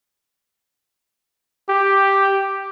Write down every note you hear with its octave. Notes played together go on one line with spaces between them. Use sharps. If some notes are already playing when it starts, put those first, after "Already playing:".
G4